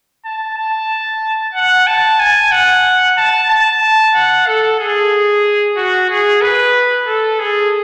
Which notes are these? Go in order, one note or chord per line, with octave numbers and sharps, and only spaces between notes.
A5
A5
F#5
A5
G#5
F#5
A5
A5
F#5
A4
G#4
F#4
G#4
B4
A4
G#4